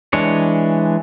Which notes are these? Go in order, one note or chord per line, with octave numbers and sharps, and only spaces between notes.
E3 G#3 D4 C#5